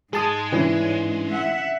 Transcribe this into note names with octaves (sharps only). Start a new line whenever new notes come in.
G#2 G#3 G#4 A5 D#6
E3 C#4 D4
E5 F#5